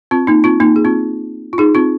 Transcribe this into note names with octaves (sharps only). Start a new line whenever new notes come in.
C4 F4
A#3 D#4
C4 F4
A#3 D#4
G#4
C4 F4
F4
D#4 G#4
C4 F4